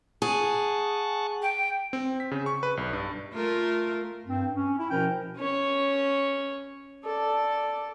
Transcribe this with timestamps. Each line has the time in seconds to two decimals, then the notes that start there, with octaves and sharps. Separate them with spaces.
0.22 G#4 F#5 A5 C#6
1.42 G5
1.93 C4
2.20 B6
2.31 C#3
2.46 C#6
2.63 B4
2.77 B1
2.93 G2
3.33 A3 F4 A#4
4.26 G2 C4
4.53 C#4
4.77 E4
4.90 B2 F3 C#4 A#4 G5
5.36 C#4 C#5
7.05 A4 D5